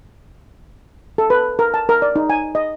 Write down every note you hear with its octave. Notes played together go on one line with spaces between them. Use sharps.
A4
B4
A#4
A5
A#4
D5
D#4
G#5
D#5